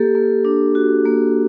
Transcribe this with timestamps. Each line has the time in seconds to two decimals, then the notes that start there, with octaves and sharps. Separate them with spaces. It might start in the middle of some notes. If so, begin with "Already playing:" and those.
Already playing: A#3 G4 A4
0.15 A#3
0.45 D4
0.75 F#4
1.05 A#3